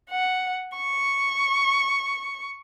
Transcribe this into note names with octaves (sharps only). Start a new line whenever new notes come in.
F#5
C#6